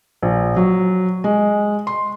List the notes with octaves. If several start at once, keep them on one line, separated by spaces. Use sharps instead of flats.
A#1
F#3
G#3
C6